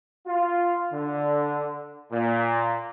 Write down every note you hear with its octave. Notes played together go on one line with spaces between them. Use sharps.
F4
D3
A#2